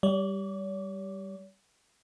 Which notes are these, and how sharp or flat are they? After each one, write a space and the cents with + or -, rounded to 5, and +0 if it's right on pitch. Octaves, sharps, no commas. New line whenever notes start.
G3 +0 C#5 +45